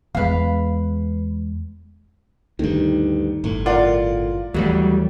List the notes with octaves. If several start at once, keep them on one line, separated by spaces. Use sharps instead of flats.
E2 G#3 B4 F5
D2 G2 D#3
G1 A2
F4 A#4 D5 F#5
D#2 E3 F#3 G3 A3